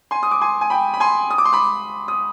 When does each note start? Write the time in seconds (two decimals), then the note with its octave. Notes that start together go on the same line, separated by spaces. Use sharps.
0.11 G#5 C6
0.23 D#6
0.31 D6
0.41 G#5 C6
0.61 G#5
0.70 G5 B5
0.94 B5
1.00 G#5 C6
1.31 D#6
1.38 D6
1.45 C6
1.53 B5 D6
2.08 D#6